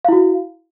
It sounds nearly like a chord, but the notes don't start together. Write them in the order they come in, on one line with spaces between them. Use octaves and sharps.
F5 E4 F#4